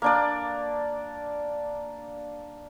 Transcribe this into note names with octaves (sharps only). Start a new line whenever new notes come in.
A#3 D4 D5